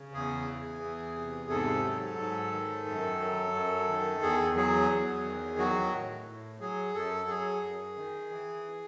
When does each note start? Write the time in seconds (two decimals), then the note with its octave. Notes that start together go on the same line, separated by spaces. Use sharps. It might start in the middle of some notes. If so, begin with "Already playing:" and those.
Already playing: C#3
0.14 E2 G#4
0.47 E3
0.81 E2
1.16 C3
1.50 G#2 A4
1.84 F#3
2.18 G#2
2.52 D#3
2.86 F#2
3.20 F#3
3.54 F#2
3.88 D#3
4.22 E2 G#4
4.56 F#3 G#4
4.90 E2
5.24 D#3
5.58 F#3 F#4
5.92 A2
6.26 A2
6.60 F#3 G#4
6.94 F#2 A4
7.28 F#3 G#4
7.62 F#2
7.96 D#3
8.30 E3